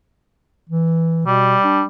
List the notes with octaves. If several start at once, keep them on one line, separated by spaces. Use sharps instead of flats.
E3
B2 G3
D4